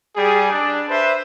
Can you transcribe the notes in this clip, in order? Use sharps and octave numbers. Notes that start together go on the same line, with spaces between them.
G3 G#4
D4
B4 C5 E5